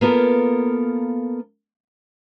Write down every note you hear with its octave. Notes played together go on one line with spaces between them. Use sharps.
A#3 B3 F4 A4 A#4